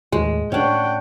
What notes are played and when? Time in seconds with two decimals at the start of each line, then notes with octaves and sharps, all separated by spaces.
0.12 D#2 A2 G#3
0.52 A2 C#4 D4 C#5 F#5 G5